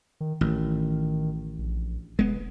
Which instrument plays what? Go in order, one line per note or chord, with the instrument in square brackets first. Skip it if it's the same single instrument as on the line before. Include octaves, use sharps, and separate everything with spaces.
[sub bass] D#3
[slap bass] A1 [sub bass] D#3
[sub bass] A#1
[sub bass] F1 [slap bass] G#3 B3